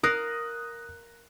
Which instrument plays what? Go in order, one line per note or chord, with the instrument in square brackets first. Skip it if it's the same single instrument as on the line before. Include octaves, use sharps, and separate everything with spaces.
[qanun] A#4 F5 [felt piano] D#6 F#6 A#6